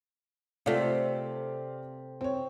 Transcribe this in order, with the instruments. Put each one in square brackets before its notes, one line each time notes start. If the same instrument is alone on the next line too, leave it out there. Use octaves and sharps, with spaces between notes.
[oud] C3 A3 [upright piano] F4 D5 F5
[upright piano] C4 C#5